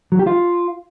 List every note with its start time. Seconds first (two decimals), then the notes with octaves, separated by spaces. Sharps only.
0.12 F#3
0.19 G4
0.27 F4